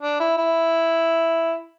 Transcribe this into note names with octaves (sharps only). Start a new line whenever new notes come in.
D4
E4
E4